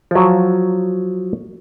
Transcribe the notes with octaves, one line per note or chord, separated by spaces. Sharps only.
F3 F#3